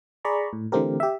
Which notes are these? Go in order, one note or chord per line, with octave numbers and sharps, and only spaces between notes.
G#4 D5 A#5 B5 C#6
A2
D3 E3 A3 C4 G4 A#4
G4 E5